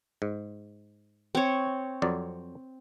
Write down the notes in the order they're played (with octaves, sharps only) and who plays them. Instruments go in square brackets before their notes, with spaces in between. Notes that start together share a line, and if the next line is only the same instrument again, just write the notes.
[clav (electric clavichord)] G#2
[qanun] C4 C#5
[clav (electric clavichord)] F2 F#3 D5